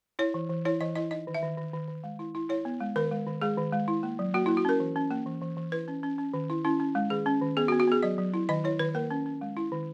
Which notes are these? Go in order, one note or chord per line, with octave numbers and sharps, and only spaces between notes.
E4 C#5
E3
E3
E4 C#5
E3 D#5
E4 D#5
D#4 D#5
D#3
E5
D#3
D#3
D#3
D#3
G#3
E4
E4
E4 C#5
B3
G#3
D#3 A#4
G#3
D#3
G#3 G#4
D#3
G#3
E4
A#3
F#3
A#3 F#4
A#3 E4
F#4
C#4 A#4
E3
C#4
A#3
E3
E3
E3
E4 B4
C#4
C#4
C#4
D#3
E4
C#4 E4
C#4
G#3
D#3 G#4
C#4
D#3
B3 G#4
F#4
B3
F#4
B3 G#4
F#3 D#5
F#3
E4
D#3 D#5
E4 C#5
D#3 B4
A#3 A#4
C#4
C#4
G#3
E4
D#3